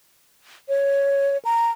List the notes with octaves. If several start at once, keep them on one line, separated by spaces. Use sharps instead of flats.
C#5
A#5